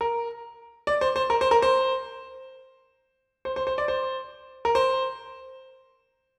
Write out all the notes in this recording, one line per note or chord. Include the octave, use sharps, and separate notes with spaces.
A#4
D5
C5
C5
A#4
C5
A#4
C5
C5
C5
C5
D5
C5
A#4
C5